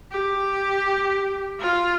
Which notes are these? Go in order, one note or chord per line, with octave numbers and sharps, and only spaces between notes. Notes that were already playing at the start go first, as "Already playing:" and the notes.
G4
F4